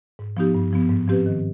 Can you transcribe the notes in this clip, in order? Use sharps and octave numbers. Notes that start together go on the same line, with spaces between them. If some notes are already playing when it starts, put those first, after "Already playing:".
G#2
F3 B3 D#4 G4
G2
F3 B3
G#2
F3 C4 G4 B4
D#3